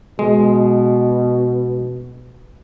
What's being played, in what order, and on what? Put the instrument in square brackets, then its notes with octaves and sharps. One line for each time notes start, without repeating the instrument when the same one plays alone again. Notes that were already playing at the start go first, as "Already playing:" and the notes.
[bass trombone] B2 [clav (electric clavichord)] G#3